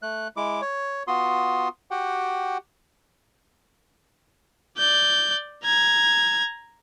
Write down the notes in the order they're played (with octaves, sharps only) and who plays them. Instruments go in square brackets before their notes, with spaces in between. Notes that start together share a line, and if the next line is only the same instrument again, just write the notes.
[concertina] A3 F#6
G#3 E4 D6
C#5
B3 F4 F#4 C6 D#6
F#4 G4 F#5 G5
[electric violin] D5 G6
A#5 G#6